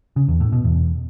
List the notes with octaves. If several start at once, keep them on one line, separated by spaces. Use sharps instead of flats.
C#3
E2
A2
B2
E2